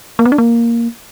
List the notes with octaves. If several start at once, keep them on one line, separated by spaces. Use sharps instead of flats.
A#3
B3
D4
A#3